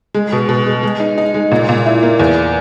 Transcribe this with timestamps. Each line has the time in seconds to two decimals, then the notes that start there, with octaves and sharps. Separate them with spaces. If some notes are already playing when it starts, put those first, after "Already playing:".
0.14 G#3
0.32 B2
0.49 B2
0.66 G#3
0.83 G#3
1.00 D#4
1.18 D#4
1.34 G#3
1.51 A#2
1.69 A#2
1.86 E4
2.03 A#3
2.20 E2